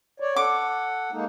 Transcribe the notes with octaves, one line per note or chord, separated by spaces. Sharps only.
C#5 D5
A4 F#5 D6
G#3 A#3 D#4